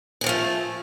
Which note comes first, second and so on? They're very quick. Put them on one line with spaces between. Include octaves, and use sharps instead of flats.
G#4 F#3 F3 A3